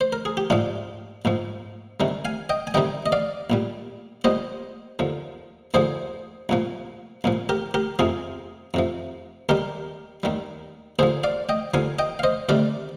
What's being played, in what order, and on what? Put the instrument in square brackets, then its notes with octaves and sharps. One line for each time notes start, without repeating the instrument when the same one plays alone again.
[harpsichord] C5
A#4
G#4
G4
A#1 G#2 F3 D4 F4
A#1 G#2 F3
C2 C3 D#3 G3
F5 G#5
D#5 G5
G#5
C2 C3 D#3 G3 D#5 G5
D#5
D5 F5
A#1 A#2 G3
A#1 A#2 G3 C5 D#5
D#2 D3 F3
D#2 D3 F3 G#4 C5
C2 A#2 F3
C2 A#2 F3
G4 A#4
G4 A#4
F2 C3 F3 F4 G#4
F2 C3 F3
D#2 D#3 G3 G4 A#4
D#2 D#3 G3
D#2 D3 F3 G#4 C5
D5 F5
D#5 G5
D#2 D3 F3 F5 G#5
D#5 G5
F5
C5 D#5
D2 C3 D#3 G3 A#4 D5